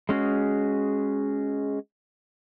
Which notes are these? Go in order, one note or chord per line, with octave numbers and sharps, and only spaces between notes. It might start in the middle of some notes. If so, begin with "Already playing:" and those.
G#3 C#4 F#4 G#4